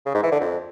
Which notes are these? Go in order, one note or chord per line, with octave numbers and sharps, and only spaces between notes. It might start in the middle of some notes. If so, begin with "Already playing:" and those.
C#3
G#2
E3
D3
F2